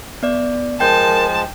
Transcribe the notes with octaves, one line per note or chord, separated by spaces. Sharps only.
B3 D5
F3 G#3 A#4 G5 A5 G6